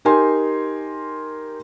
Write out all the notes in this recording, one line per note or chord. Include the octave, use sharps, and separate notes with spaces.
D#4 G4 A#4 G#5 C6